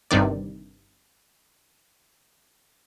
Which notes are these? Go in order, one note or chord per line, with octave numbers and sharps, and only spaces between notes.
G1 G2 C3 D#3 D5